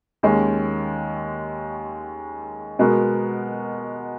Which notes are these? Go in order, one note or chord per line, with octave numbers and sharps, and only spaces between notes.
D#2 D#3 G#3 C#4
B2 G#3 B3 F#4 A#4